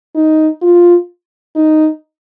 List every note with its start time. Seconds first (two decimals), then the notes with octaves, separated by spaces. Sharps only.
0.15 D#4
0.61 F4
1.55 D#4